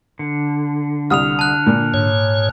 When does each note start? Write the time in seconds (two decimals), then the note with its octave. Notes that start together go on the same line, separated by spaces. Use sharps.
0.19 D3
1.10 C2 D#6 F6 F7
1.39 A5 F#6
1.66 A#2
1.94 G#2 C#5